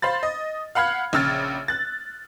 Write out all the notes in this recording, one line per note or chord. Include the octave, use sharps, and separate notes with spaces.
C5 F5 B5 A6
D#5
F5 F#5 B5 F6 G#6
A#1 C#3 E6 F6 A6
F#6 A6